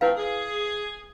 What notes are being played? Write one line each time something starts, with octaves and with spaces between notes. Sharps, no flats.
A3 C4 E4 F4 B4 F5
G#4